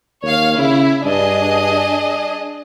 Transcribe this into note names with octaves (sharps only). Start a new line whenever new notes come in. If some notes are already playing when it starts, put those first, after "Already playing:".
D#2 C#5 F5
C#3 E4
G2 D4 G#4 D#5